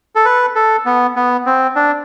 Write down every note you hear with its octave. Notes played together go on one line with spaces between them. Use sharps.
A4
B4
A4
B3
B3
C4
D4